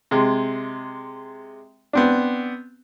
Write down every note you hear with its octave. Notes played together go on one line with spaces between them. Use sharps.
C3 G#3
B3 C4 D4